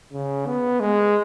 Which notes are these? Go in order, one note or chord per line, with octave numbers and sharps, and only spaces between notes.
C#3
B3
G#3